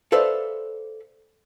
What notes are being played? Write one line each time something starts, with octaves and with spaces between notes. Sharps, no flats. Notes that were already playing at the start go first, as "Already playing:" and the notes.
A4 B4 C5 D5 E5 F5